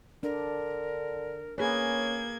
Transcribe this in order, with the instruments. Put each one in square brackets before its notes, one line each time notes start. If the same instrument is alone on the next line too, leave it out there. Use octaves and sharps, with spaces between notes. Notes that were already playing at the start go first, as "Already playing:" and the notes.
[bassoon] D3 [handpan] D4 [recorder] A#4
[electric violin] A#3 G#6 [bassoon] C#4 [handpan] G#4 B4